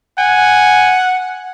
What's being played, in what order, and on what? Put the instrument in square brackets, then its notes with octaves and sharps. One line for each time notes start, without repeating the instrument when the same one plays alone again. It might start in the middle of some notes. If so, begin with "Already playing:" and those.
[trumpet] F#5 [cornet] G#5